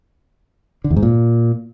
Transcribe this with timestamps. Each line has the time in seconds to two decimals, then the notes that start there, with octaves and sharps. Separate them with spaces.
0.84 D3
0.90 E2
0.96 G#2
1.03 A#2